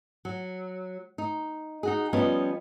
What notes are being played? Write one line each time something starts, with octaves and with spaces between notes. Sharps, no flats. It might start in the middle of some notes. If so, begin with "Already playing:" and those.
F#3
D#4
D#4 F#4 G#4
F3 G3 B3 C#4 C#5 D#5